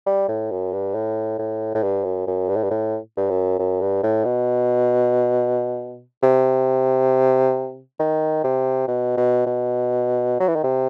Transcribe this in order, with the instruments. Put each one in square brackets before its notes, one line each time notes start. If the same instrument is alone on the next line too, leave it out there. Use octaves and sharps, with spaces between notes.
[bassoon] G3
A2
F#2
G2
A2
A2
A2
G2
F#2
F#2
G2
A2
G2
A2
G2
F#2
F#2
G2
A2
B2
C3
D#3
C3
B2
B2
B2
F#3
E3
D#3
C3